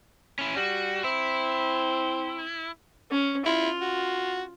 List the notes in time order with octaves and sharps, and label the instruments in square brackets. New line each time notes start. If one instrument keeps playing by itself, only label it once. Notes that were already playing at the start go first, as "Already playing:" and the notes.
[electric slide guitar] C#4 E4
[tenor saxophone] G3 [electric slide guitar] F#4
[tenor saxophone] C4 [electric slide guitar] E4
[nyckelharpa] C#4
[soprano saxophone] E4 [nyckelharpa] F4
[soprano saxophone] F#4